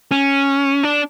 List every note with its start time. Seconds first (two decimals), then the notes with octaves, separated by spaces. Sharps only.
0.11 C#4
0.83 D4